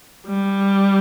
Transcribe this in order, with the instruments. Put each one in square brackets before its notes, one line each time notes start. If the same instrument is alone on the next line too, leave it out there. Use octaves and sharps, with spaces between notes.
[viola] G3